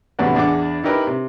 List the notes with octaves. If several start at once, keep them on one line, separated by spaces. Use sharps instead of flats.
E2 A2 C3 D4 F#4 B4
E2 D4 G#4 F#5 D6
D#4 E4 G4 A#4 B4
C3